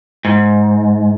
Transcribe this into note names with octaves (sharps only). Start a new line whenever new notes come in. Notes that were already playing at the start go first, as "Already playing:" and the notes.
G#2